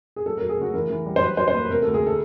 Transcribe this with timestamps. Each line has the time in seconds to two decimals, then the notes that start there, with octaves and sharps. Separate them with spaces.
0.16 G#4
0.26 F#3 A4
0.37 F#3 A#4
0.49 G#4
0.57 C#3 F#4
0.74 E3 A#4
0.90 E3
1.06 G3
1.16 C5
1.21 F#3 B4
1.37 F#3 C5
1.48 C5
1.54 A#3 B4
1.65 B4
1.70 C3 A#4
1.82 D2 A4
1.94 G#4
2.07 A4